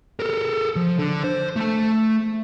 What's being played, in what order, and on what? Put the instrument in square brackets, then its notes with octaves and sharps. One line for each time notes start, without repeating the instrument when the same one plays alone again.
[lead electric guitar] A4 A#4
F3
D3
C5
A3 A5